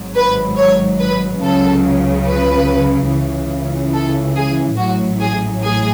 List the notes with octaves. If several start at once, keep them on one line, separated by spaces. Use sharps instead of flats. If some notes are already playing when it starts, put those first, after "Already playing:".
Already playing: G#1 G#2 F#3
B4
C#5
B4
C#2 C#3 F#3 A4
B4
C#2 C#3 E3
A4
G#4
A1 A2 F#3 F#4
G#4
G#4